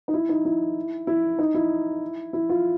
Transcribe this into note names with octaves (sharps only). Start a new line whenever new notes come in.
D#4
E4
D#4
E4
E4
D#4
E4
E4
F4